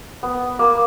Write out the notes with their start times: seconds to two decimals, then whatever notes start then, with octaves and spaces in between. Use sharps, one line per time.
0.23 B3
0.59 A#3